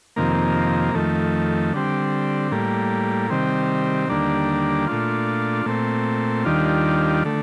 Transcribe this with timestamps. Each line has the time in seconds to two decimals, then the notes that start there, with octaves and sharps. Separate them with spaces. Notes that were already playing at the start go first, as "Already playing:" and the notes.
0.16 F2 C3 D#3 A#3
0.95 F2 D#3 A3
1.74 D3 G3 C4
2.51 A2 G3 A#3
3.30 C3 D#3 G3 C4
4.09 D#2 D3 G3 A#3 D4
4.87 A#2 A3 D4 F4
5.66 A#2 A3 C4
6.45 D#2 D#3 G3 D4 F4
7.25 D3 A3